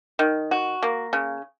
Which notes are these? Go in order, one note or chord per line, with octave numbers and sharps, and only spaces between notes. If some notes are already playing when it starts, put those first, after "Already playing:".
D#3
F#4
A#3
C#3